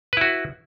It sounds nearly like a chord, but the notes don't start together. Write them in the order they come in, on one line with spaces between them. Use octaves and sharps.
B4 E4 F#4